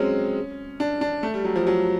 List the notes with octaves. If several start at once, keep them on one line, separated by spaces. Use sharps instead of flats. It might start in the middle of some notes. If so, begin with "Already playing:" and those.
Already playing: F#3 G#3 C4 C#4
D4
D4
A3
G3
F#3
F3
F#3